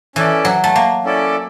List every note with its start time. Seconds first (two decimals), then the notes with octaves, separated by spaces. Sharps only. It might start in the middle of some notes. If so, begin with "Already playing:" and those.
0.16 E3 C#4 E4 A4 D5
0.45 F#3
0.64 A3
0.76 A#3
1.05 C#4 E4 A4 D5